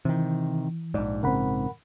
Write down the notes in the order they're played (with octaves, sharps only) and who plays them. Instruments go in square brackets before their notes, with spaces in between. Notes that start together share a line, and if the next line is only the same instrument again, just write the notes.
[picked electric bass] C3 D#3 [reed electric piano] E3
[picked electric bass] A#1 G#2 [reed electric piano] D5
[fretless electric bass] C#3 C4 [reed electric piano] A#4 F#5 B5